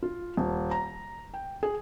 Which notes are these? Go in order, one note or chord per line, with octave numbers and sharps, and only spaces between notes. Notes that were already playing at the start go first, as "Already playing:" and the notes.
F4
D#1
A#5
G5
G#4